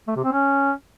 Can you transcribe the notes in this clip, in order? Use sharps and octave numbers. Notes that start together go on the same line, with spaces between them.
A3
C3
C4
C#4